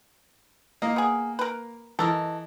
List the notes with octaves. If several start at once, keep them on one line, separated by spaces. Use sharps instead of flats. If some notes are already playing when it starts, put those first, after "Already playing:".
A#3 D#5
B3 G#4
A#4 B4
E3 A4 A#4 D#5